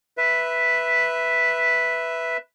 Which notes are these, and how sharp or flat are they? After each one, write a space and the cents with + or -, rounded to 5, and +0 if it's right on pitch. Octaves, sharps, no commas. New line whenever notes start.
B4 +0 E5 +0